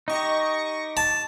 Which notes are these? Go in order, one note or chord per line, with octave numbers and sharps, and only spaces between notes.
D#4 G4 D#5 C#6 A#6
A5